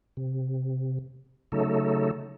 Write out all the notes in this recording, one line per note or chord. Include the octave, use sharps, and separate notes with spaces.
C3
C#3 F#3 A3 D#4 A4